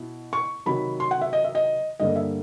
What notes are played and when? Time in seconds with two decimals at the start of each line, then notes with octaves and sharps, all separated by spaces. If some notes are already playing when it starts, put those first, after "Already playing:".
Already playing: B2 E4
0.33 C#6
0.66 C3 D#3 F#3 B5
1.00 C6
1.11 F#5
1.21 E5
1.33 D#5
1.44 E5
1.55 D#5
2.00 G2 D3 G3 A#3 D#5
2.16 E5